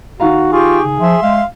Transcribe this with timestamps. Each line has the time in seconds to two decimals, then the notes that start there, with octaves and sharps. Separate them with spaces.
0.20 D#3 F#4 F5 A#5
0.53 F4 G4 G#4 C#6
0.84 C#3
1.00 F3 E5 C6
1.23 G#3 F5